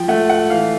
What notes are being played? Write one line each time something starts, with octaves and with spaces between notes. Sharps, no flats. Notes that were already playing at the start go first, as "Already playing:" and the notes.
Already playing: F3 G5
A3 F#5
F#5
E3 F5